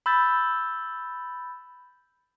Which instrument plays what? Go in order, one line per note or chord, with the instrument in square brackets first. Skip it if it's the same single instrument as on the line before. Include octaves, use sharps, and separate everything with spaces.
[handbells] B5 E6 G6 A6